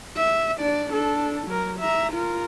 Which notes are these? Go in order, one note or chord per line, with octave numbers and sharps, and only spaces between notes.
E5
D4 D5
D4 A4
F#3 A#4
E5 A#5
F4 A#4